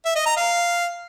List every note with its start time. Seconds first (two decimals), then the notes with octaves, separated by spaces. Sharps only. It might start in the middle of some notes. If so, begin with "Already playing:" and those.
0.05 E5
0.16 D#5
0.26 A#5
0.37 F5